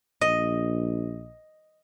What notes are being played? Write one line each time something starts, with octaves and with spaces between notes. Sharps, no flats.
A#1 D#5